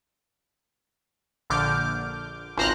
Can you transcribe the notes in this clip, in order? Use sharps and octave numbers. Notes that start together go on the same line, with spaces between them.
A#1 D3 D6 F6 G6
G#1 C#2 C5 A#5 F6 F#6